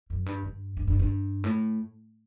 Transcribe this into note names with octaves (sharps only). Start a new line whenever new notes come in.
F#2
G2
G2
G2
G2
G2
A2